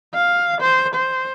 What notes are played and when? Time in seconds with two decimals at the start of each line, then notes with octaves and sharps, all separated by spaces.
0.14 F5
0.61 C5
0.95 C5